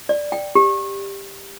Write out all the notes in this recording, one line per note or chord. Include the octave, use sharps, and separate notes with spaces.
D5
G5
G4